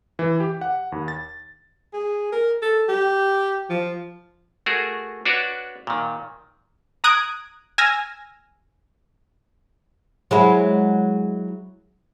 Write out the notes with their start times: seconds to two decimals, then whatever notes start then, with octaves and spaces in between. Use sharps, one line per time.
0.19 E3
0.40 G4
0.61 F#5
0.92 D#2
1.08 A6
1.93 G#4
2.32 A#4
2.62 A4
2.89 G4
3.70 F3
4.66 A3 F#4 G#4 A#4
5.25 D4 F#4 B4 C#5 D5
5.87 A#2 D#3
7.04 A#5 D#6 F#6 G#6 D7
7.78 G#5 E6 F6 A#6
10.31 F#3 G#3 E4